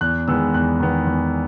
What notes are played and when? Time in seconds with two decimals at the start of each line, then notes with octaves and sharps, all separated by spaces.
0.01 E2 F#6
0.28 D#3 G#3 B3 E6
0.54 E2 F#6
0.80 D#3 G#3 B3
1.06 E2